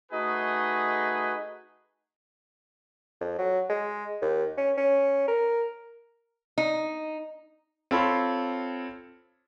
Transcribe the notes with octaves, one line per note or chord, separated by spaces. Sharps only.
A3 D#4 F#4 G#4 B4 D#5
F2
F#3
G#3
D#2
C#4
C#4
A#4
D#4
C4 F4 A4 C#5 B5 C6